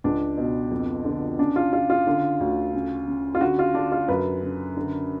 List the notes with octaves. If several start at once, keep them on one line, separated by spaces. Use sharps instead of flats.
C#2 D4
B2
F2
D3
C#3 D4
F4
C#3 F4
F4
D3
D2
C#3
C#3
F4
D3 F#4
F4
D3 D4
F4
F#2 B4
C#3
D3